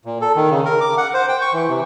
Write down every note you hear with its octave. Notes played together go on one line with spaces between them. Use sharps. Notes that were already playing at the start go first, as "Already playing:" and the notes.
A#2
A4
D#3
C#3
A#4
D6
F#5
C5
G5
C#6
E3
C3